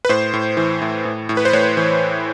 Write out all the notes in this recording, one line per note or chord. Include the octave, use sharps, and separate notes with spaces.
B4
A2 C5
A2
E3
A2
A2
A2
B4
C5
A2 C#5
E3